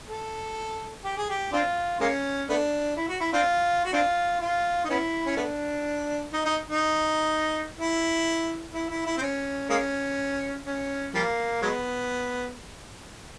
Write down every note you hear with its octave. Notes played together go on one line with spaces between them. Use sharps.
A4
G4
G#4
G4
C4 D4 F4
G#3 A#3 C#4
A3 B3 D4
E4
F#4
E4
C4 D4 F4
F#4
C4 D4 F4
F4
D#4
B3 C#4 E4
C#4
A3 B3 D4
D#4
D#4
D#4
E4
E4
E4
E4
C4
C#4
G#3 A#3 C#4
C#4
F3 G3 A#3
F#3 G#3 B3